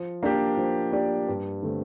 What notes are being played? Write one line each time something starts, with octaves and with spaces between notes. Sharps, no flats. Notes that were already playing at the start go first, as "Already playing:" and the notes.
Already playing: F3
A#3 D4 G4 D5
F3
A#3 D4 G4 D5
G2
D3 A3 C4